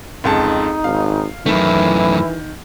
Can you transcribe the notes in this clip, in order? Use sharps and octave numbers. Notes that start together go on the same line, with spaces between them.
F1 C#2 D#4 A5
G#1 F5
F#2 D#3 E3 A3 E4